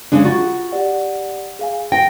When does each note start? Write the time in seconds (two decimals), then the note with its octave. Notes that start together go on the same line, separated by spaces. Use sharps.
0.12 C#3 G#3 D4
0.25 F4 F#4 C#6 A6
0.72 G4 D5 F#5
1.59 G#4 F5 G#5
1.92 G5 A#6